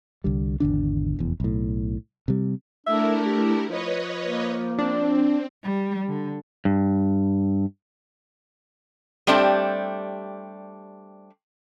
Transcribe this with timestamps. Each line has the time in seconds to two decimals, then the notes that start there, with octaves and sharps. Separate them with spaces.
0.24 C2 D3 G3
0.60 G#1 E2 D3 D4
1.19 F1 E2
1.40 B1 A2
2.28 C3 G3
2.86 A3 D4 E4 A#4 E5
3.26 G4
3.69 F3 B4 C#5 D#5
4.23 A#3
4.79 C4 D4
5.63 G3
6.08 D3
6.65 G2
9.27 G3 A3 C4 D4 G4